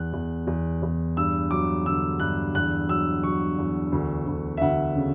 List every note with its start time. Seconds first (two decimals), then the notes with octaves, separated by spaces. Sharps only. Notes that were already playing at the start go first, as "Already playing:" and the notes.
Already playing: E2 F#6
0.13 E2
0.47 E2
0.83 E2
1.17 G2 E6
1.51 F#3 D6
1.86 D3 E6
2.20 G2 F#6
2.55 E2 F#6
2.89 F#3 E6
3.23 F#3 C#6
3.58 E2
3.92 D2
4.27 D2
4.57 E5
4.62 D2 F#5
4.95 C#3